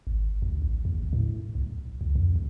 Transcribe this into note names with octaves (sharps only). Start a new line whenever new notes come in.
G#1
D2
A1
D#2
A2
B1
C#2
F2
D2